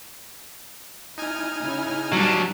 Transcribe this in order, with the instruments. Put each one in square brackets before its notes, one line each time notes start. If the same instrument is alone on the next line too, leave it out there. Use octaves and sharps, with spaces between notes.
[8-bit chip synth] D#4 G#5 F6 [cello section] E4
[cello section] C#3 E4
[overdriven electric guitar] F#3 D4 [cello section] G3